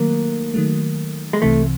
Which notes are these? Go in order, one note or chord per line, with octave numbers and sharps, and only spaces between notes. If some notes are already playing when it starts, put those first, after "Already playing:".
Already playing: D#3 F#3 A3 A#3
D#3 F#3 A3
G#3
C2 C3 E3 A3